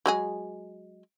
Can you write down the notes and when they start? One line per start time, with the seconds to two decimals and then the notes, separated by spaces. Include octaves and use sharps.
0.06 F#3 G#3 G#4